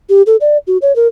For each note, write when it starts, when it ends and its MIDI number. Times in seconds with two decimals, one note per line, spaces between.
0.09 0.22 67
0.26 0.36 69
0.41 0.57 74
0.67 0.77 66
0.82 0.95 73
0.96 1.07 70